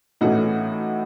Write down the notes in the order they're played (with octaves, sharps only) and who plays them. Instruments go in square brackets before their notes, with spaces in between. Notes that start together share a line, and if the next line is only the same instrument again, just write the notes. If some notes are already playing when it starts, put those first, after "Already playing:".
[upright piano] A2 E3 A3 C#4 D#4 F#4